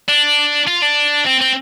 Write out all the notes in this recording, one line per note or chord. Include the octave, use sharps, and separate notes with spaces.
D4
F4
D4
C4
C4